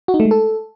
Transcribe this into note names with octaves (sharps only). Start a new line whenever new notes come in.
F#4
D#4
A3
G#3
A4